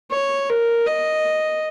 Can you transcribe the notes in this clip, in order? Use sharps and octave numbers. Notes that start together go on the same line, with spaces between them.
C#5
A#4
D#5